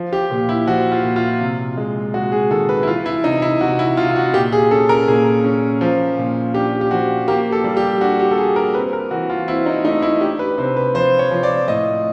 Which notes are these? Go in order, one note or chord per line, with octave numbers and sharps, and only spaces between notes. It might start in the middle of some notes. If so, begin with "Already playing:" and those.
Already playing: F3
G4
A#2
E4
F3 F#4
F4
A#2
F4
C3
G#3
G#3 F#4
G#4
D#3 A4
B4
E4
E3 F4
E4
C3 D#4
E4
C3 F#4
E4
C3 F4
F4
F#4
A#2 G4
G#4
C#4 A4
A#4
A#2 G#4
C#4
F3
A#2
D4 G4
G4
F3 F#4
A#3 G4
A4
G3
G4
D4 F#4
G4
A4
A#3 G#4
A#4
C4 B4
A#4
E3 F#4
F4
C4 E4
D#4
A3 D#4
E4
D4 G4
B4
C3 C5
B4
F3 C5
C#5
F3
D5
A2 D#5